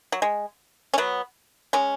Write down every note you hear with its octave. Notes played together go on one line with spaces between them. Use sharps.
F#3
G#3
C#4
F#3 B3
G#3 C#4